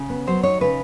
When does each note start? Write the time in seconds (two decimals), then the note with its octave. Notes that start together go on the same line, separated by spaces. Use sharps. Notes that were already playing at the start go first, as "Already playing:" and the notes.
Already playing: C#3
0.10 B3
0.27 F#3 C5
0.43 D#4 C#5
0.61 C#3 B4